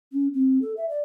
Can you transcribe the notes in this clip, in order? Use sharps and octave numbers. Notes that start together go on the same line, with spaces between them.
C#4
C4
A4
E5
D5